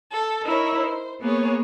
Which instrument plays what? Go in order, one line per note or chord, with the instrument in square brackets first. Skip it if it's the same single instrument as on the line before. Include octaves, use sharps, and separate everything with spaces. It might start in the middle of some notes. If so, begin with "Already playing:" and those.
[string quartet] A4
D#4 E4 A#4 C#5
C5
A#3 B3 G#4 C#5